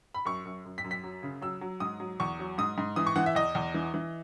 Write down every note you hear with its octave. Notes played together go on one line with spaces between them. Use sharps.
B5
F#2 C#6
F#2
F#2
B6
F#2
B6
F#3
C#3
F#3 E6
F#3
G#2 D#6
F#3
E2 C#6
F#3
G#2 D#6
G#2
E3 D#6
C#6
E3 F#5
E5
E2 D#5
E2
E3
E3